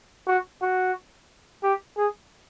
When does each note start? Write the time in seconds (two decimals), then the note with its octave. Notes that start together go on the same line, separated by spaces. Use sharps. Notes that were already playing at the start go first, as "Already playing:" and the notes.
0.27 F#4
0.62 F#4
1.63 G4
1.97 G#4